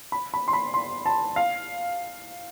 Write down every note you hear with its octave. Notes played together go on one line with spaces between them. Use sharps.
B5
B5
C6
B5
C6
A5
F5